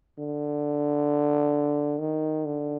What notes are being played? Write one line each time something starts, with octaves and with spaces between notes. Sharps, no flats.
D3
D#3
D3